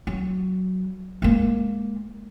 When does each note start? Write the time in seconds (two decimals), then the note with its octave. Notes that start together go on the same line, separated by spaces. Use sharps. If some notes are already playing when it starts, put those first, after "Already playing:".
0.07 F#3
1.22 G#3 A#3